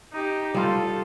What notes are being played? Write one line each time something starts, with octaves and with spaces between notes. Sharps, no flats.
D#4 G4
G3 F4 A4